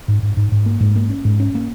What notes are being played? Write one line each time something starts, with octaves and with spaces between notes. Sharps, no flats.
G#2
G#2
G#2
G#2
A#3
G#2
A#3
C#4
G#2
C#4
A#3